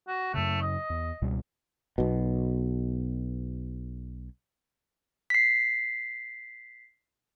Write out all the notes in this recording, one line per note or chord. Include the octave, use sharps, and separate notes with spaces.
F#4
F#2 C#3 A3
D#5
E2
C#2 B2 G3
B1 B2
B6 C7